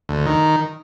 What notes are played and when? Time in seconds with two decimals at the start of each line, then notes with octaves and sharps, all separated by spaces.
0.09 D2
0.26 D#3